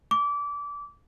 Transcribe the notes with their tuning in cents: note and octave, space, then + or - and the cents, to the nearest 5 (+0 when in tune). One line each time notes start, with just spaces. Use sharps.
D6 -25